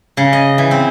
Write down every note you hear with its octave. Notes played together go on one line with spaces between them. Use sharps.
C#3
D#5
E3
C4